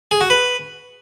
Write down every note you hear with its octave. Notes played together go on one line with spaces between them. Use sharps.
G#4
F#4
B4